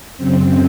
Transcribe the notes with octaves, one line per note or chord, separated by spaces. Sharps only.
F#2 C#3 C4